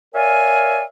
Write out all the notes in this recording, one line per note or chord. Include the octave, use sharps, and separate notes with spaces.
A#4 C#5 D5 E5 F5 G#5